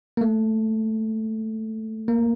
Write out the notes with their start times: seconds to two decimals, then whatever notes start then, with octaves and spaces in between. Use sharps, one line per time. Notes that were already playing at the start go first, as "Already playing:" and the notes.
0.17 A#3
0.21 A3
2.08 A#3